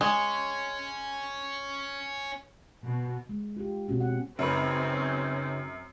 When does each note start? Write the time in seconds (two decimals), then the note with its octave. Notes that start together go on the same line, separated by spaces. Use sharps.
0.01 G#3 C#4
2.84 B2
3.29 G#3
3.57 F4 G4
3.88 B2 C4 C#4 F#4
4.00 C4 F#5
4.39 F#2 C#3 C4 C#4 D#4 B4